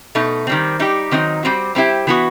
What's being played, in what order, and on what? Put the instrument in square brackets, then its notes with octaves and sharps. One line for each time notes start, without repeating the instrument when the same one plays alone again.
[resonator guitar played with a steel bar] B2 A3 D#4
D#3 G3 C4
G3 D#4 G4
D#3 F#3 C4 D#4
G3 C4 F#4
G3 C4 E4 G4
E3 B3 F#4